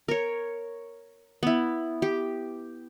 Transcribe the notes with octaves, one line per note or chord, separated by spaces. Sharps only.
A#4 C#5
B3 E4
G4